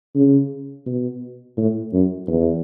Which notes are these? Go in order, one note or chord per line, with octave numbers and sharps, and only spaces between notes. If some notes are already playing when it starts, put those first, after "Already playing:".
C#3
B2
A2
F#2
E2